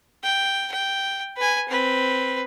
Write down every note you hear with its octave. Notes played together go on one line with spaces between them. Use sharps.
G5
G5
B4 G#5
C4 B4